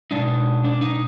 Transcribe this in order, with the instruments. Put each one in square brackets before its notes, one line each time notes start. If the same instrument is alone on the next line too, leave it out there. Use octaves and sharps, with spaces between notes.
[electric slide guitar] B2 G#3 D4 D#4
D4
D#4